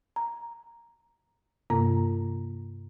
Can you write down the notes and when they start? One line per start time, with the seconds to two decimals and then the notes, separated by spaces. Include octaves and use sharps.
0.16 A#5
1.70 G2 C3 A#3 A#5